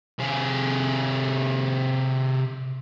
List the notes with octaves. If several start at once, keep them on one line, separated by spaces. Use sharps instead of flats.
C3 G#4